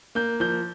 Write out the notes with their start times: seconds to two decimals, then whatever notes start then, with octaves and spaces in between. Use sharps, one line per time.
0.15 A#3 G6
0.40 F3 G6